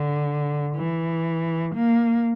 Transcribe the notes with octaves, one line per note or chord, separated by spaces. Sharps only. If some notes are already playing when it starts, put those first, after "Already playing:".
Already playing: D3
E3
A#3